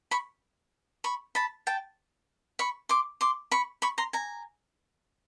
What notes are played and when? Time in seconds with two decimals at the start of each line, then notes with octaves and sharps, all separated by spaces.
0.11 B5 C#6
1.04 B5 C#6
1.35 A5 B5
1.67 G5 A5
2.59 B5 C#6
2.89 C6 D6
3.21 C6 D6
3.51 B5 C#6
3.82 B5 C#6
3.98 A#5 C6
4.13 G#5 A#5